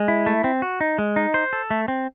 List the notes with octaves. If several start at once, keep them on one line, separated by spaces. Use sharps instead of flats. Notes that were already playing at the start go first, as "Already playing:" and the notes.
Already playing: G#3
E4
A3
C4
F#4
D#4
G#3
D#4
C5
A4
A3
C4